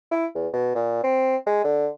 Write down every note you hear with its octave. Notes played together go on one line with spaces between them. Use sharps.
E4
E2
B2
A#2
C4
G#3
D3